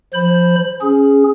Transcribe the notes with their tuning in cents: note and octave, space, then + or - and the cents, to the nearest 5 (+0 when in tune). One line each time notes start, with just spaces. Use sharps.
F3 +0 C5 +0 B5 +0
C#4 +0 G#4 +0